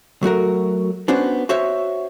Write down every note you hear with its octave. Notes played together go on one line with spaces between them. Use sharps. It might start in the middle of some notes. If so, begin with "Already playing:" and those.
F#3 A3 F#4 A#4
B3 C#4 D4 F#4 C5
F#4 C5 C#5 E5